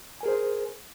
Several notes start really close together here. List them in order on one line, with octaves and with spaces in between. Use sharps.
G#5 A#4 G#4 C5